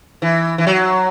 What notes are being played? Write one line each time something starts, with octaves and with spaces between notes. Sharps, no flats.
E3
E3
F#3